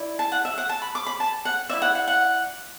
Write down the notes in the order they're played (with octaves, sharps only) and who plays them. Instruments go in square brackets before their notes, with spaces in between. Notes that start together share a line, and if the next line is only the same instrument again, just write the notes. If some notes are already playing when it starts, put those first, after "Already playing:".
Already playing: [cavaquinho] E4 D5
A5
F#5
E5
F#5
A5
B5
D6
B5
A5
F#5
E4 D5 E5
F#5
F#5
F#5